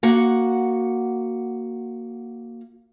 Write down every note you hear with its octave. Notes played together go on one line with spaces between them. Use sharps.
A#3 F#4 F#5